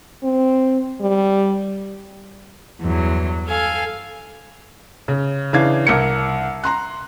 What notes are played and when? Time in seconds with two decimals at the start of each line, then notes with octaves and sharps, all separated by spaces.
0.23 C4
1.01 G3
2.82 E2 G2 F#3
3.47 A4 F5 G#5
5.08 C#3
5.53 C#3 E3 D4 F5 G#6
5.87 C2 A#4 C#7
6.64 A#5 C6 F#6